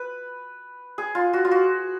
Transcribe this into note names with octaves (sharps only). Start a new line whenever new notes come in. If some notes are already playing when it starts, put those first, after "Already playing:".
Already playing: B4
G#4
F4
F#4
F4
F#4